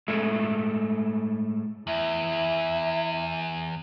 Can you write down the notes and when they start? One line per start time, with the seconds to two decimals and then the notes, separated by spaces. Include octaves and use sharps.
0.08 A2 G#3 A3 G#4 E5
1.87 E2 E4 E5